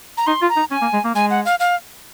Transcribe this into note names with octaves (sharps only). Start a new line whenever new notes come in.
A#5
D#4 C6
F4
A#5
D#4
C#4 G#5
A#3
G#3
A#3
G#3 G#5
F#5
F5
F5